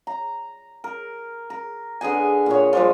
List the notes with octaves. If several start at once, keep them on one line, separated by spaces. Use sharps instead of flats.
A#5
A#4
A#4
D3 B3 G#4 G#5
A#2 C#5
F3 G3 G#3